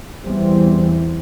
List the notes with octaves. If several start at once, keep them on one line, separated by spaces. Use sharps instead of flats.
E2 E3 G3 C4